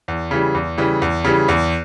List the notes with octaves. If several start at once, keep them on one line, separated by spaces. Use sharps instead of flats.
E2
C#3 E3 G3
E2
C#3 E3 G3
E2
C#3 E3 G3
E2